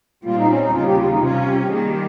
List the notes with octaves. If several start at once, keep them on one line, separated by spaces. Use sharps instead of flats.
A#2 G3 C4 F4
D#4
C#4
D#4
D#2 C#3 G3 F4
G4
F4
D#4
C3 G3 C#4 F4
G4
G4
D#3 G3 A#3 G#4
G4